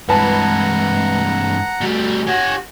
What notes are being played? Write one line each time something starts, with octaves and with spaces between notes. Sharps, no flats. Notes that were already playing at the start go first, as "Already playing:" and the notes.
G2 E3 G#3 B4 F#5 A5 A#5
G3 A3 F#4
G4 C#5 F#5 G#5 C#6